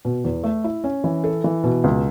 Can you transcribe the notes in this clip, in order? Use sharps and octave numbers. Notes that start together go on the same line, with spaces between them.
B2
E2
A3
E4
C#4
E3
A4
E3
B2
C#2